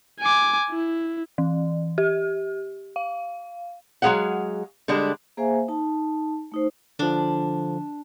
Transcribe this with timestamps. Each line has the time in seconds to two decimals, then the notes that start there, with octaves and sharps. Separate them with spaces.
0.21 G#5 D6
0.70 E4
1.38 E3
1.98 G4
2.96 F5
4.02 F#3 G#3 A#3 G#4 F5 F#5
4.88 D3 G3 G#3 D4
5.37 A#3 G#4 C5 E5 F5 G#5
5.68 D#4 A5
6.52 A3 D#4 C5
6.99 D3 F3 D4